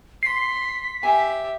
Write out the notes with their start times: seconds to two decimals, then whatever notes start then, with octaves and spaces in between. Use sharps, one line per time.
0.23 C6 B6 C7
1.03 G4 E5 G#5